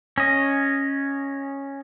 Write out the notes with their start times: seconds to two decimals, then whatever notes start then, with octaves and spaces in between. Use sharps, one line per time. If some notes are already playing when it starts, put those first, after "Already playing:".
0.18 C#4 D#5